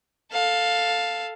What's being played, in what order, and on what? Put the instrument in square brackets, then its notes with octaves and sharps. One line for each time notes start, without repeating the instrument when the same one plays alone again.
[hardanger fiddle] A4 F5